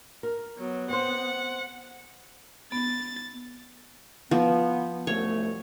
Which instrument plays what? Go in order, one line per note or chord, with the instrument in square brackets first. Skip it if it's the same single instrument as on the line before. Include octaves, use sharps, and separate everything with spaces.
[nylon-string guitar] A#4
[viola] F#3 [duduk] B3
[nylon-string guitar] C4 C5 [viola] F#5
[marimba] B3 [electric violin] A6
[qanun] F3 [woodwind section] B3
[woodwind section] C2 F#2 A3 [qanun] C#5